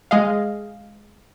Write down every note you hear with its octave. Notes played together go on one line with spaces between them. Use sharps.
G#3 G#4 D#5 F5